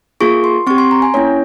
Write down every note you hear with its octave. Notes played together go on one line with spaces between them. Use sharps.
A#3 F4 G#4 C#6
C6
C4 G4 C#6
C6
A#5
G#5
A#3 C#4 E4 C#5